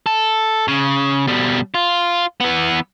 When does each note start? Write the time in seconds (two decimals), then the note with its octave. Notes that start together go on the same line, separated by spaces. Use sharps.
0.06 A4
0.68 C#3
1.27 B2 G3
1.74 F4
2.40 E3 B3